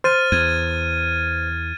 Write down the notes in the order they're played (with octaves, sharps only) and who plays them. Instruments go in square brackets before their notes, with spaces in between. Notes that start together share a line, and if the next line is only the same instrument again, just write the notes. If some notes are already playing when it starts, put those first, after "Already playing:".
[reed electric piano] C5 [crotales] F6 A6 D#7
[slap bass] E2 [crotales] G#6 D#7